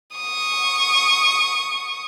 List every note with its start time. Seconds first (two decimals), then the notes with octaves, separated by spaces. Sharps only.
0.17 C#6 D#6